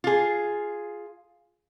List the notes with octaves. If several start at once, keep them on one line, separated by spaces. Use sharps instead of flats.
F4 G#4